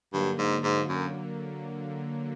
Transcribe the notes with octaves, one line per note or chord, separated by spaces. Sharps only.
G2 D3 F#3 A#3
G#2
G#2
F#2